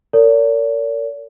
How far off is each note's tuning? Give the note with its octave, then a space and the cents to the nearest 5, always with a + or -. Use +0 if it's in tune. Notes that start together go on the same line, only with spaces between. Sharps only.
A#4 -35 D5 -45